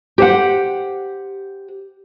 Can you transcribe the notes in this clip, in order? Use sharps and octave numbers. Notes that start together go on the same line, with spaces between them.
G4 C5 F#5